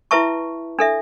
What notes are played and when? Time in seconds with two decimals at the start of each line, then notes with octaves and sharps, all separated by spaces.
0.11 E4 B4 E5 A5 C#6
0.79 D4 A4 E5